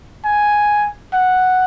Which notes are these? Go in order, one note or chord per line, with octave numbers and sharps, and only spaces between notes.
G#5
F#5